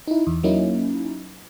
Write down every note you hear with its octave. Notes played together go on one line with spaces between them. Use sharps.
D#4 E4
E2
F#3 A#3 C#4 D#4 E4